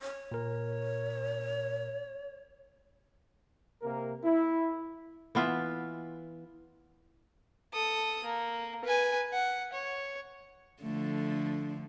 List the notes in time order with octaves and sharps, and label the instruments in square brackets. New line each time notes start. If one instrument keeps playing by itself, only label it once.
[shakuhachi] C#5
[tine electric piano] A#2 A#4
[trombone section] C3 A#3 A#4
E4
[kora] E3 B3 F4 E5
[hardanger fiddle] A4 D#6
A#3
B4 G#5
F#5
C#5
[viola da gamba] D3 F3 A3